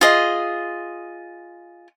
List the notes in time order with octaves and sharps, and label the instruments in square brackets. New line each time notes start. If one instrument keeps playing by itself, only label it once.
[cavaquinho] F4 G#4 D#5